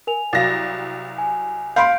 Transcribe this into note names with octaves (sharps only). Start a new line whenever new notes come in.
A#4 G#5 F7
C2 F#3 F5 A6 A#6
G#5
F5 B5 C6 G6 D7